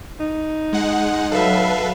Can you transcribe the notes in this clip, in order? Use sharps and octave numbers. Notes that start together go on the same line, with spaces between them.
D#4
G#3 F#5
F#3 A4 B4 E5 F5